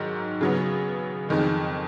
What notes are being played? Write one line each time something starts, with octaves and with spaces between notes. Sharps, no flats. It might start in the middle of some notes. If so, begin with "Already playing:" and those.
Already playing: G#2 D#3 F#3
C#3 F#3 B3
F2 D#3 G#3